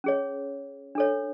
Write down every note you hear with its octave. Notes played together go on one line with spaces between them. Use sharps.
C#4 G#4 C#5
D4 A4 C#5